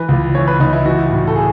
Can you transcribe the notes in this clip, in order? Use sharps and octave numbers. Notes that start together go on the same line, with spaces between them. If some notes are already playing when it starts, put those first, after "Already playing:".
Already playing: E3 B4
C#2
E3 C#5
B4
C#2 D#4
E4
E3 F#4
A2
A4
G#4